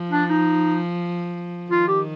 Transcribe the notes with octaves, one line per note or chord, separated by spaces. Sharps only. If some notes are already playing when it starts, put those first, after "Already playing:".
Already playing: F3
D4
D#4
D#3 F4
G4